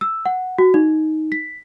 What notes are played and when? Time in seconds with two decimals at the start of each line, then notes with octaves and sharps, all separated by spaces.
0.01 E6
0.26 F#5
0.58 F#4
0.74 D#4
1.32 B6